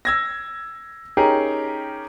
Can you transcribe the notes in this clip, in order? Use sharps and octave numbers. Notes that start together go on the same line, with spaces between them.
E6 G#6 A#6
C#4 D#4 G4 G#4 A#4